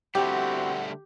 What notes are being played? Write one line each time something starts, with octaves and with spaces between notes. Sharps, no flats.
D3 G3 A3 C4 E4 F#4 G4 F#5